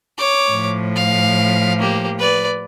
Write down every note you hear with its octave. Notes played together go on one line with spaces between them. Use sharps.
C#5 D6
A2 F3
F5
A#3 G4
B4 D5